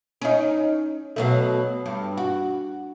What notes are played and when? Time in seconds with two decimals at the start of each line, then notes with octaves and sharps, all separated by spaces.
0.22 C#4 D#4
1.16 B2 F#3 A3
1.86 G2
2.17 F#4